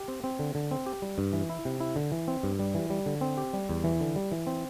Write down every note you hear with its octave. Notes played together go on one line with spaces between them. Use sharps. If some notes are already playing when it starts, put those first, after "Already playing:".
Already playing: G4
C4
C4
D3
D3
C4
G4
G3
G2
E3
E4
C3
E4
D3
E3
C4
G2
G3
E3
G3
D3
C4
G4
G3
E2
E3
D3
G3
E3
C4